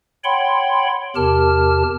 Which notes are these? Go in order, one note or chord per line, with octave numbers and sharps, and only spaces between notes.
C#5 F#5 G5 B5 C6
E2 C3 G4 A#4 A5 F6